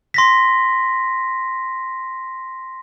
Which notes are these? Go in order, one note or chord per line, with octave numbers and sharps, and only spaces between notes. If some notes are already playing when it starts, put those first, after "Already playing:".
C6 A#6 B6